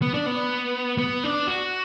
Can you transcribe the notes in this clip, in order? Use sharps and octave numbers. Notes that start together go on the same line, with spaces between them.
B3
D4
B3
B3
D4
F#4